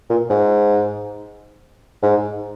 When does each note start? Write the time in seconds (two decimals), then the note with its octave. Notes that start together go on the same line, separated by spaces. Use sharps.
0.10 A#2
0.30 G#2
2.03 G#2